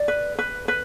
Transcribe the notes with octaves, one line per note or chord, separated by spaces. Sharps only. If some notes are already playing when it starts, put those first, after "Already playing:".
Already playing: D5
B4
B4
B4